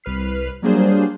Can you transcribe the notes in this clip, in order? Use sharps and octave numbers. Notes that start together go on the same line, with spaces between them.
C2 B4 F6 C7
F#3 G3 A#3 D4 G#4 C5